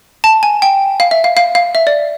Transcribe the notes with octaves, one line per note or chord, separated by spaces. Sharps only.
A5
G#5
G5
F5
E5
F5
F5
F5
E5
D5